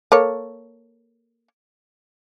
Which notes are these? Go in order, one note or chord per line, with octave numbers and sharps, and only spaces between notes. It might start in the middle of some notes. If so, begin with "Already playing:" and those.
A#3 A4 C#5